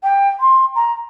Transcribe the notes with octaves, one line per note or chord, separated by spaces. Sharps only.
G5
C6
A#5